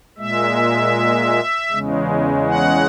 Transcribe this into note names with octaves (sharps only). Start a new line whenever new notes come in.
A#2 G#3 E5
E2 C#3 G#3
F#5